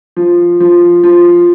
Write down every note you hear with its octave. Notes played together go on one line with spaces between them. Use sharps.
F3
F3
F3